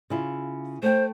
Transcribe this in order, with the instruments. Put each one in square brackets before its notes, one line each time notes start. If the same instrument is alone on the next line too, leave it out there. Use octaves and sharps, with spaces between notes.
[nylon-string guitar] C#3 E4 F4
[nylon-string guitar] A3 G5 [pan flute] C5